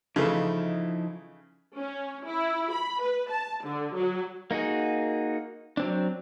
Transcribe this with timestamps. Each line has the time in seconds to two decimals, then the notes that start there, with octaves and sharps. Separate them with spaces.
0.16 C#3 E3 F3 A3 D#4 E4
1.76 C#4
2.26 E4
2.72 B5
3.01 B4
3.30 A5
3.64 D3
3.95 F#3
4.51 A#3 D#4 F#4 G#4
5.77 F#3 C4 D4